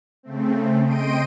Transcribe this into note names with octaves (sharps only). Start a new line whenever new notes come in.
C#3 A3 C4
D#5 G5 C6 D7 D#7